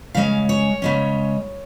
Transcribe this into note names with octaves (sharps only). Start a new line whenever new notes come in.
C#3 G#3 C#4 F5
C#5
C#3 G#3 C#4